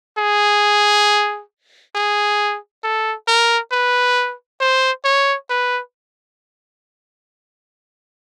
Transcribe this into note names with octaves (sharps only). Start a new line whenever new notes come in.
G#4
G#4
A4
A#4
B4
C5
C#5
B4